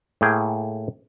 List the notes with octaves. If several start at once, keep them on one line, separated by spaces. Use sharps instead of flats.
A2 A#3 G#4 G5